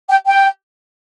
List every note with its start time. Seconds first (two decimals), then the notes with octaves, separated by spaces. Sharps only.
0.09 G5
0.26 G5